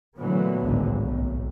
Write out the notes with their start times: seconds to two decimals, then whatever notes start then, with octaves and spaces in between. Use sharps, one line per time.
0.18 A#2 D3 E3 F#3 A3 B3
0.62 G#1 C#2 A2 D3
0.99 B1 A2